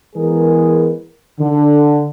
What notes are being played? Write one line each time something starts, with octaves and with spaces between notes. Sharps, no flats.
E3 G#3 B3 G#4 A#4
D3